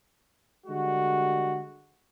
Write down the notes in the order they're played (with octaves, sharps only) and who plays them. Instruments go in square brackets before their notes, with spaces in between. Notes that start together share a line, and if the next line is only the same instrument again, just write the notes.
[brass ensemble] D3 G3 G#3 F#4